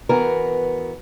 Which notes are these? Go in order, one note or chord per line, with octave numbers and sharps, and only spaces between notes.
E3 B3 F#4 A#4